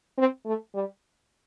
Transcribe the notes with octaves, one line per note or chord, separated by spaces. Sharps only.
C4
A3
G3